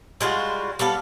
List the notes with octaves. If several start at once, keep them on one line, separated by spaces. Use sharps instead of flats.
G3 G#3 F4 F#4
G3 B3 A4 F5